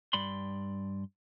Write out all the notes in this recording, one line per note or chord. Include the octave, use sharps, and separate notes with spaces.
G2 D5 B5 C6